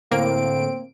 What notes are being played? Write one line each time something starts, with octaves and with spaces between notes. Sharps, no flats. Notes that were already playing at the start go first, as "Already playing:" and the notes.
A2 D3 A#3 C4 D7